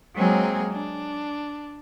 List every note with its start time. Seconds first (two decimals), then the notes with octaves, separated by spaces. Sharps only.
0.15 F#3 G#3 A#3 C4 G#4
0.72 D4